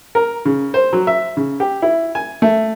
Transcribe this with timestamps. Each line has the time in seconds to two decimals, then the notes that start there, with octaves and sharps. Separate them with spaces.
0.15 A#4
0.45 C#3
0.74 C5
0.93 F#3
1.07 E5
1.37 C#3
1.60 G4
1.82 E4
2.15 G#5
2.42 A3